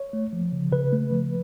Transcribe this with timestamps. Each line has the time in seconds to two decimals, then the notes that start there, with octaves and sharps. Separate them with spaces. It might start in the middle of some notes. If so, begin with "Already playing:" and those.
Already playing: C#5
0.13 A3
0.33 F3
0.52 C#3
0.72 C#3 B4
0.92 A3
1.11 F3